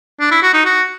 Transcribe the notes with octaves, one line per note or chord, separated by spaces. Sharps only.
D4
E4
F#4
D#4
F#4